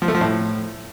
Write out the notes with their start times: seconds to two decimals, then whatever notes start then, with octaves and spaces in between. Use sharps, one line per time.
0.02 F3
0.08 A3
0.15 F3
0.21 A2